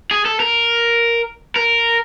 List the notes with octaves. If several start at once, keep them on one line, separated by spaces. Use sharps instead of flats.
G#4
A4
A#4
A#4